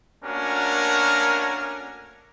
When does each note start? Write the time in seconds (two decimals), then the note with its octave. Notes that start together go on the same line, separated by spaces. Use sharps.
0.25 A3 A#3 C#4 D4 F#4 A#4